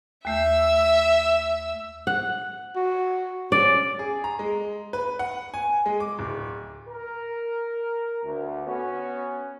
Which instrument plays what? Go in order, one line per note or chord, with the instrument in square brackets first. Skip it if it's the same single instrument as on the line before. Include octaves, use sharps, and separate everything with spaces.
[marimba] D#2 A3 G6 [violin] E5 E6
[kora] F#5
[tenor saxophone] F#4
[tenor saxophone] C#4 [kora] D5
[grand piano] G#4
A#5
G#3
B4
F#5
G#5
G#3
D6
D1
[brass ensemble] A#4
D2
B3 C#4 F#4